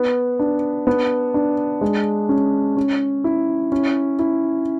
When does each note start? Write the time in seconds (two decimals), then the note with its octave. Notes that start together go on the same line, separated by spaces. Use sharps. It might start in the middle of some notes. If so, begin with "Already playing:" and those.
Already playing: B3
0.39 D4
0.87 B3
1.34 D4
1.81 G#3
2.29 C#4
2.77 C#4
3.24 E4
3.72 C#4
4.19 E4